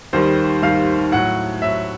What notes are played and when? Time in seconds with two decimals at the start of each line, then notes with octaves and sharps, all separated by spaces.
0.13 D#2 D#3 G3 C5
0.62 D#2 D#3 G3 F5
1.12 A2 F#3 F#5
1.62 A2 F#3 E5